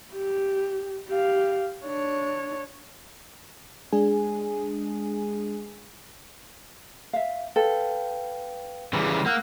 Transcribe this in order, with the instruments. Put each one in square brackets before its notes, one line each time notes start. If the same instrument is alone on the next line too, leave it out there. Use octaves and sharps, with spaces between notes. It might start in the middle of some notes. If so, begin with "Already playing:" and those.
[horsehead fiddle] G4
G4 F5
D4 C#5
[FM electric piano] G#3 D4 G#4 G#5
[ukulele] E5 F5
[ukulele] A4 [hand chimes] B4 F5 G5
[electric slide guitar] C#3 E3 G3
[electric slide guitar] A#3 [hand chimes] F#5 E6 F#6